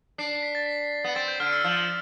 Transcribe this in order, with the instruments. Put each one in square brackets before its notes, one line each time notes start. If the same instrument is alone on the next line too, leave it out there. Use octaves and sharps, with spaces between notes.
[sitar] D4 [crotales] C7
[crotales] C7
B6
A6
B6
[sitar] B3
[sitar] C4 [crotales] A6
[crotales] G6
[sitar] D3 [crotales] F6
[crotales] E6
[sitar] F3 [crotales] E6